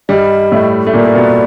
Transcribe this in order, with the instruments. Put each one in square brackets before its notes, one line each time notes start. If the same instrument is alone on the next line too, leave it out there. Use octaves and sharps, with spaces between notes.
[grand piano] G2 G3 [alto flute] D#5
[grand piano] A2 A3
A3
[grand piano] A#2 A#3 [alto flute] D5
[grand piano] A#3
B2 B3